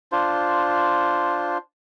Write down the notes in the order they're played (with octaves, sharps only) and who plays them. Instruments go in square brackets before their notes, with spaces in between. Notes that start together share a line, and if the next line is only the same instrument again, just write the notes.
[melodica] D4 F4 C5